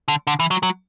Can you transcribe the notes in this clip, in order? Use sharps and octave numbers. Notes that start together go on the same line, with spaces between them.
D3
D3
E3
F#3
F#3